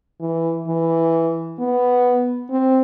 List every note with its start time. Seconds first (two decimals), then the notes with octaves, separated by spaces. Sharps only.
0.20 E3
0.68 E3
1.59 B3
2.50 C4